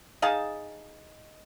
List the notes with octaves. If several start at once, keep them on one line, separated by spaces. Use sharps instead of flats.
D#4 G#4 F5 A5